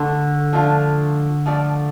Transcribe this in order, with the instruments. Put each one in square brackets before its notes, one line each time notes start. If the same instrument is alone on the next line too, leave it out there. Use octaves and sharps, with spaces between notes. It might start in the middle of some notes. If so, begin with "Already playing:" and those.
Already playing: [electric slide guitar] D3 [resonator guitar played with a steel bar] A3 D4 A4
[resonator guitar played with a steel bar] F3 A3 D4 F4
F3 A3 F4 A4 D5